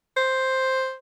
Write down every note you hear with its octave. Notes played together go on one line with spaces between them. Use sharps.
C5